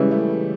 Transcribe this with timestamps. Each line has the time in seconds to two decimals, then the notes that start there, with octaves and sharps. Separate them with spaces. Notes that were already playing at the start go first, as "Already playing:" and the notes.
Already playing: C#3 E3 G3 G#3
0.11 A3